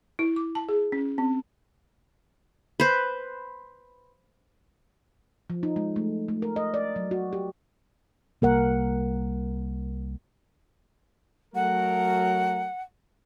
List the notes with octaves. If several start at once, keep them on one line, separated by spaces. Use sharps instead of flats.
E4
D6
A5
G#4
C#4
C4
B4 C5
F3
D#4
G#3
A3
A3
A#4
D#5
D5
F#3
F#4
G4
C2 C3 G3 A#3 A#4 F#5
F#3 A3 A#4 F#5